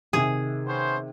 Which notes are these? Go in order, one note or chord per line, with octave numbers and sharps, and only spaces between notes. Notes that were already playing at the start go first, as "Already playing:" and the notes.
C3 D#3 G#4
B3 C#4 C5